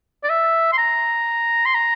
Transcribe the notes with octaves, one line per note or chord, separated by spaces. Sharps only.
D5
E5
C6
A#5
C6
A#5